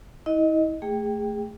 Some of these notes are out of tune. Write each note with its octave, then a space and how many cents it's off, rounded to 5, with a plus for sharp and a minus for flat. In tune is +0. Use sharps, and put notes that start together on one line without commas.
E4 -40 D#5 +0
A3 +0 G#4 -20 G5 +0